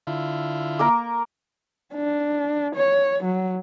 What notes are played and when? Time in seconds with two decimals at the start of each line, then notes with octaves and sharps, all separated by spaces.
0.07 D3 E4 F4
0.79 A#3 A#4 A#5
1.94 D4
2.76 C#5
3.24 F#3